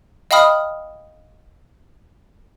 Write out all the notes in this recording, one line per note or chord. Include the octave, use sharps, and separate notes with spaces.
D#5 F5 G5 B5 D#6 F6